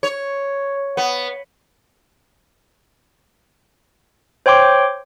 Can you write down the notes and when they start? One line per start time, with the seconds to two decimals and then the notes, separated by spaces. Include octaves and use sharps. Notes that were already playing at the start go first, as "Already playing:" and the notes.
0.03 C#5
0.97 B3
4.46 C5 C#5 G5 C6 D6